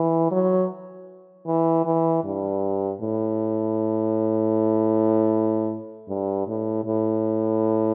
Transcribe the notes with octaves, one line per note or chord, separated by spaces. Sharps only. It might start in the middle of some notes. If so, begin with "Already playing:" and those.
Already playing: E3
F#3
E3
E3
G2
A2
G2
A2
A2